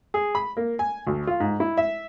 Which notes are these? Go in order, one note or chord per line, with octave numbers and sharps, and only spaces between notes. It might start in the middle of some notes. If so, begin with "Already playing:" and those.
G#4
B5
A#3
G#5
D2
F4
G#2
E4
E5